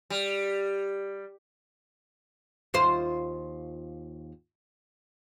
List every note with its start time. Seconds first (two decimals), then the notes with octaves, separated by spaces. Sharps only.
0.10 G3
2.74 D#2 F4 C5